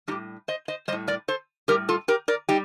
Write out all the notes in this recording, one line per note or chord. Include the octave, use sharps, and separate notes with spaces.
A2 G3 D#4 G4
C5 D#5
C5 D#5
A2 G3 C5 D#5
A#4 D5
A4 C5
A2 G3 G4 A#4
F4 A4
G4 A#4
A#4 D5
G3 D#4 G4